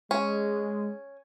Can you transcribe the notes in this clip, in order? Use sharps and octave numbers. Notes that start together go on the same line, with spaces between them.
G#3 C#4